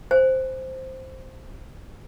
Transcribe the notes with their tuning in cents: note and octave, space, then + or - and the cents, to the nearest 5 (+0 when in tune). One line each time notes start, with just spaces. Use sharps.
C5 +0 G#5 +0